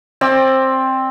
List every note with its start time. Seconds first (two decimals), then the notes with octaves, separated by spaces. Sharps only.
0.21 C4 D5 E6